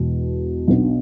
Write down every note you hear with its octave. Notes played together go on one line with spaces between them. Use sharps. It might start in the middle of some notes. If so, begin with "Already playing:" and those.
Already playing: E1 E2 B2
B1 B2 B3 D4